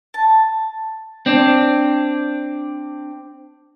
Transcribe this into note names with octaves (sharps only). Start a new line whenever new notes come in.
A5
C4 D4